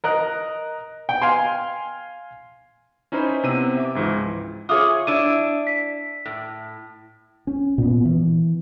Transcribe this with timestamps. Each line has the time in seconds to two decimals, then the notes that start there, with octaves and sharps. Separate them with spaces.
0.04 A#4 D#5 F#6
1.09 G5
1.22 F5 G#5 C6
3.12 C#4 D#4 E4 B4 C5 B5
3.44 C3 B3 C4 E6 D#7
3.77 E5 D6
3.95 C#2 G#2 E3 F3
4.69 F4 G#4 C#5 E5 D6 D#6
5.07 D4 E4 D#7
5.67 B6
6.26 A2
7.47 C#4
7.78 A#2 B3
8.05 E3